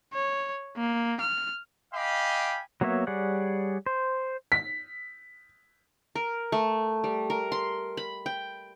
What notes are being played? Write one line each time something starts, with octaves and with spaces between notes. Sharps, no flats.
C#5
A#3
F6
D#5 F5 G5 G#5 B5 D6
F#3 A#3 B3 C#5 E5
G3 G#4 C#5 D5 F#5
C5
B6
A#4
A3
G3
A#4
C6
B5
G5